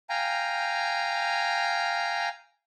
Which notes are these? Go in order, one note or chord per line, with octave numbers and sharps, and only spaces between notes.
F5 G5 G#5 A#5